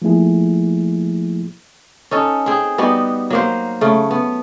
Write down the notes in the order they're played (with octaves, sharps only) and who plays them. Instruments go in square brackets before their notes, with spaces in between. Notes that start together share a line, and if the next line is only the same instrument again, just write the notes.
[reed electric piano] F3 A3 A#3 E4 G#4
[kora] C#4 D#4 A4
C4 G#4
G3 B3 D#4 F#4
F#3 A#3 C5
C#3 A3
B3